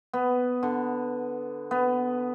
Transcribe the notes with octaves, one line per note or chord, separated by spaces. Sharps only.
B3
D3
B3